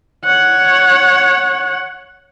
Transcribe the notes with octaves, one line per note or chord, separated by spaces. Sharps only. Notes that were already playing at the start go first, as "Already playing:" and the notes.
C#5 F#5